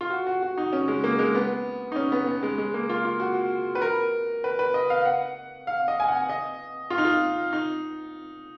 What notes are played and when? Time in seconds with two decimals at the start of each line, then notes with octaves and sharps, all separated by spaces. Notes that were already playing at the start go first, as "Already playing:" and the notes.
0.01 F4
0.10 F#4
0.27 F#4
0.42 F#4
0.58 D#4
0.73 C#4
0.88 G#3
1.04 A#3
1.19 G#3
1.35 B3
1.92 D#4
1.96 C#4
2.12 B3
2.27 B3
2.43 G#3
2.58 G#3
2.74 A#3
2.89 F4
3.05 F4
3.20 F#4
3.75 B4
3.82 A#4
4.44 B4
4.59 B4
4.74 D#5
4.90 F5
5.05 F#5
5.67 F5
5.88 D#5
6.00 G#5
6.08 F#5
6.29 D#5
6.90 F4
6.98 D#4
7.05 F4
7.53 D#4